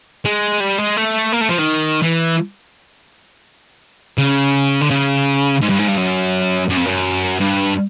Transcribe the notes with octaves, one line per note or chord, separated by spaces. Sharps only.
G#3
G3
G#3
A3
A#3
A3
F3
D#3
E3
C#3
D3
C#3
G#2
G2
G#2
G2
F#2
F#2
F2
F#2
G2